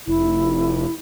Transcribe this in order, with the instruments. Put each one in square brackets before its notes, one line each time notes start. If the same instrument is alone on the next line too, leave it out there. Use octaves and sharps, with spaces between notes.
[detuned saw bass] F1 [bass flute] E4